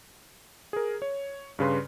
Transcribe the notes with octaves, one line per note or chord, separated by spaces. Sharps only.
G#4 A#4
C#5
G2 C#3 B4 C6